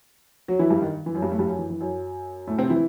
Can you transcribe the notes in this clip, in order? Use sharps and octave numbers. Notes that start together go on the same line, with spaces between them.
F#3 F#4
E3 E4
G2 G3
D#3
E3
F#2 F#3
G2 G3
A2 A3
G2 G3
F#2 F#3
E3
E3
F#2 F#3
A2 A3
C3 C4
E3 E4